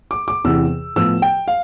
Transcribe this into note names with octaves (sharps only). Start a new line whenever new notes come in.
D6
D6
E2 C3 E3 E6
A2 F3 B3 E6
G5
F5